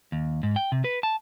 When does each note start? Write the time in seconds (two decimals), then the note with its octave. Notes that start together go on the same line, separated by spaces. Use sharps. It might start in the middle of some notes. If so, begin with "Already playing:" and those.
0.12 D#2
0.43 G#2
0.56 G5
0.72 C3
0.84 B4
1.03 A5